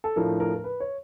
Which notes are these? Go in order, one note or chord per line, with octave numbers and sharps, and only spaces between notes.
A4
A2 F3 A3 D4 A#4
A#4
A#4
B4
C#5